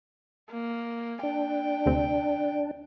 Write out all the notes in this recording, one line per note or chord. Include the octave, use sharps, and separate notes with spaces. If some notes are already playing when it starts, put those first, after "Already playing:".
A#3
D4 G5
D2 C3 C4